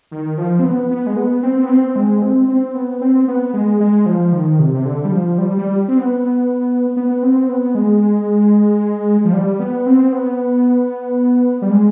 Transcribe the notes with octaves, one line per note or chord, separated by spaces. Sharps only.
D#3
F3
C4
B3
B3
G#3
B3
C4
B3
C4
G#3
C4
C4
B3
C4
B3
G#3
G#3
F3
D#3
C3
C3
D3
G3
F3
G3
G3
C4
B3
B3
C4
B3
G#3
F3
G3
B3
C4
B3
G3
G#3